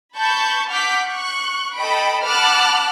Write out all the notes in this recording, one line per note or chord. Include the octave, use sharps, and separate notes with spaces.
A5 B5 C#6 G6
F#5 D6 F6 G6 B6
C#6 F#6
A4 D#5 G5 B5 D7
F#5 A5 B5 D6 F6 F#6